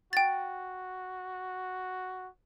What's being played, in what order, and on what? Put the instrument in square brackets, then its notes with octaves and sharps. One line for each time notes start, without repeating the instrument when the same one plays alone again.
[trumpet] F#4 [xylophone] G5 A6